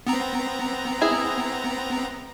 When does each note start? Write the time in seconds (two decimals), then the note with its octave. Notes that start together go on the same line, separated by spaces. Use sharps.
0.07 B3 C4 A#5
1.02 E4 G#4